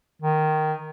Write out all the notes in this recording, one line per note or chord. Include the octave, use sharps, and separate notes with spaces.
D#3